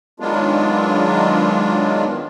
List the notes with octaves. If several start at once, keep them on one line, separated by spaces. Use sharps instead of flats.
D#3 F#3 G#3 B3 D4 F4